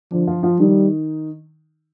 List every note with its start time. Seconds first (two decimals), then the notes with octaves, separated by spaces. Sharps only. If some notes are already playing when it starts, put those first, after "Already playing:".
0.12 D3 F3 D4
0.27 F3 F4
0.43 F3 F4
0.59 D#3 G3 D#4